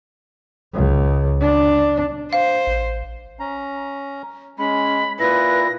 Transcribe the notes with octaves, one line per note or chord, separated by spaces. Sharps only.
C#2
D4
C5 F5
A1
C#4 A#5
G#3 C#4 B5
A#2 E4 B4 A#6